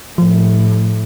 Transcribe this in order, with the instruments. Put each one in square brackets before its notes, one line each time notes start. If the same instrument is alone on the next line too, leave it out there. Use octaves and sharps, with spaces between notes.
[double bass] A2 [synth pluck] F3